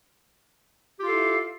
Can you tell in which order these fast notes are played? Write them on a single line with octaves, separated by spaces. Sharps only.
G4 F4 F5 A4 E4